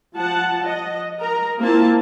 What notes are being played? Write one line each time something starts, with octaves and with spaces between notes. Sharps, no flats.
F3 F#5 A5
D#5
A#4 A#5
A#3 C4 E4 F4 A5